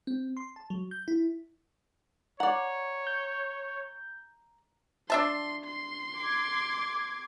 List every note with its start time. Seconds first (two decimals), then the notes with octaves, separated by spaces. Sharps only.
0.07 C4
0.37 C6
0.56 A5
0.70 F#3
0.91 G6
1.08 E4
2.40 C#5 D5 F#5 A#5
3.07 G6
5.10 D4 E5 A5 C6
5.66 C6
6.16 D6 G#6